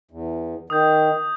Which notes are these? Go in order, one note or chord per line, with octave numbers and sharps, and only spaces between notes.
E2
D#3 D#6 G6